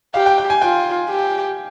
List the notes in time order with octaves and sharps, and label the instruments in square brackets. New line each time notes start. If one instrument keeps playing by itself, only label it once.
[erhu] G4 [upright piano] F5
[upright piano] G5
G5
G#5
[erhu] F4 [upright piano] G5
[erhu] G4